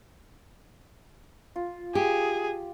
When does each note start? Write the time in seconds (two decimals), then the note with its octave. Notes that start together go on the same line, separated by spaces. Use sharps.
1.56 F4
1.95 G4 G#4